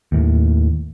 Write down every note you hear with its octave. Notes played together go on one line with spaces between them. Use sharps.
D#2 A2